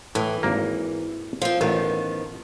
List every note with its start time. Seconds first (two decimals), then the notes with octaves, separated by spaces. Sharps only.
0.15 A2 E3
0.43 G#1 A#3
1.42 F3 C4
1.61 A1 D#3 F3 B3